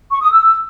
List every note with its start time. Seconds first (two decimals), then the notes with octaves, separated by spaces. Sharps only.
0.11 C#6
0.21 D#6
0.31 E6